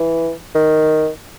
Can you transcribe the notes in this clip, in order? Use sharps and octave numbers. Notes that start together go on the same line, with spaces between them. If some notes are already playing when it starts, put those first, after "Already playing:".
Already playing: E3
D#3